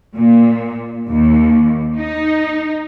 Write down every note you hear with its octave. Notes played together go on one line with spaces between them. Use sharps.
A#2
D#2
D#4